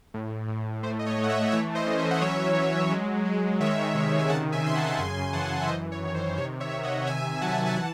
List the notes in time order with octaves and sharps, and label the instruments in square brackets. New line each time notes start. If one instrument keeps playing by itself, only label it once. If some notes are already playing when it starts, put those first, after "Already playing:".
[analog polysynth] A2
A2
A3 C5
D#5
C#5
A3
F#5
C#5 E5
E3 C#5 E5
C5 D#5
C#4
E5
F#5
F#3 C#5 E5
F#3
G#3
G#3
D#3 C#5 E5
C3
G#5
C#3 F#5 A5
E5 G#5
C#3 C6
F#5 A5
G#5
A5
F#2 G#5 C6
E3 F#5 A5
E5
F#2 C5 D#5
C#5
D#3
C5
C3 C#5
C#5 E5
D#3
D#5 F#5
C3 E5 G#5
F#3 F#5 A5
F#5
G#5
E3 F#5 A5